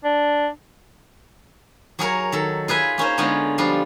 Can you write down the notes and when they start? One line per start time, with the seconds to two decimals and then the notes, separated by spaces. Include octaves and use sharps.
0.04 D4
1.99 F#3 G#4 A#4 C#5
2.32 D#3 A4
2.68 F4 G#4 B4 E5
2.98 A#3 C#4 D#4 C5
3.18 D3 G#3 B3 C#4 D#4 F4
3.58 F3 G3 D4 F4